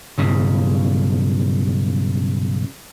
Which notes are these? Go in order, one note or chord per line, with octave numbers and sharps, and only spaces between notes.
B1 G2 C#3